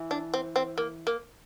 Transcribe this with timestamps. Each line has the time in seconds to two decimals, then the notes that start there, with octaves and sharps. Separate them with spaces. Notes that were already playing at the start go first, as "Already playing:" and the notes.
Already playing: E3
0.11 D4
0.34 C4
0.56 C4
0.78 A#3
1.07 A#3